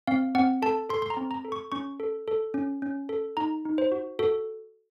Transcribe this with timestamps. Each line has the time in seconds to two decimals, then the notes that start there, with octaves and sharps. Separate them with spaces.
0.07 C4 F5
0.35 C4 F#5
0.62 A4 A5
0.90 A4 C6
1.02 C6
1.10 A#5
1.17 C4
1.31 A#5
1.45 A4
1.52 C#6
1.72 C#4 C#6
2.00 A4
2.28 A4
2.54 C#4
2.82 C#4
3.09 A4
3.37 D#4 A#5
3.65 D#4
3.78 C5
3.92 F#4
4.19 F#4 A4